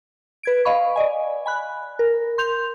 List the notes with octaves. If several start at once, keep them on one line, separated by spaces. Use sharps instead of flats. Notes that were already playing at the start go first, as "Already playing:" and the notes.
B4 G#6 D7
D#5 F5 B5 C#6
D5 D#5 G#5
G#5 B5 F#6
A#4
C6 G6 F7